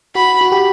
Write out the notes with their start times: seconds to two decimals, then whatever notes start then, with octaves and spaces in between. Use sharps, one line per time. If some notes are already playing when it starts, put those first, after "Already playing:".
0.15 F#4 B5
0.41 F#4
0.52 G4